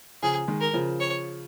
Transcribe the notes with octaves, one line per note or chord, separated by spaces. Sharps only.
C#3 F3 G#4
D#3 G#3
A#4
C#3 F3
C#5